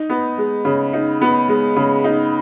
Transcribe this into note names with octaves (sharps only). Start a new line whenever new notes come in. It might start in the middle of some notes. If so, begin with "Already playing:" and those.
Already playing: D#4
B3
G#3
C#3
D#4
B3
G#3
C#3
D#4